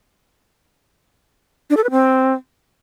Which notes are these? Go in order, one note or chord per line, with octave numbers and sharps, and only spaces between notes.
D4
A4
B4
C4